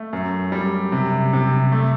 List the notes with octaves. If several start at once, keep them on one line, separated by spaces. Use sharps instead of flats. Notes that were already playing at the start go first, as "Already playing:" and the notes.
Already playing: A3
F#2
G3
C3
C3
A3